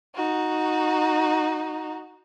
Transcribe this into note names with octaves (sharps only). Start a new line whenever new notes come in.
D#4 F#4